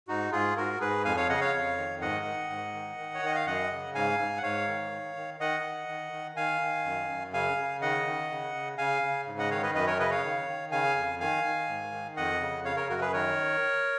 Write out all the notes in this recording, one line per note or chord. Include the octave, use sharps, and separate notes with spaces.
G#2 D#4 F#4
G#2 F4 G#4
G#2 F#4 A#4
G#2 G#4 B4
F2 F5 G#5
C#5 F5
C#3 D#5 F#5
C#5 F5
F2
D#3
G#2 D#5 F#5
D#3
G#2
D#3
D#3
C#5
D#3 D#5
F5
F#2 D#5 F#5
C#3
G#2 F5 G#5
G#2
F#5
G#2 C#5 F5
D#3
D#3
D#3
D#3 D#5 F#5
D#3
D#3
D#3
D#3 F5 G#5
D#3
F#2
F#2
C#3 F5 G#5
C#3
D#3 D#5 F#5
D#3
C#3
C#3
C#3 F5 G#5
C#3
G#2
D#5 F#5
D#3 C#5 F5
B4 D#5
F#2 B4 D#5
A#4 C#5
C#3 B4 D#5
C#5 F5
D#3
D#3
C#3 F5 G#5
F2
D#3 F5 G#5
D#3
G#2
D#3
F2 D#5 F#5
C#3
C#3 C#5 F5
A#4 C#5
F#2 F#4 A#4
G#4 B4
D#3 A#4 C#5